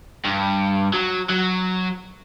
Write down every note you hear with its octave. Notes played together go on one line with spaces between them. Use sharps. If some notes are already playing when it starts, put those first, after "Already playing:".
G2
F#3
F#3